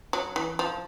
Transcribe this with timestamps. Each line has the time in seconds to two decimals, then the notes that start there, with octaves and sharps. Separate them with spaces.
0.13 F#3
0.36 E3
0.59 F3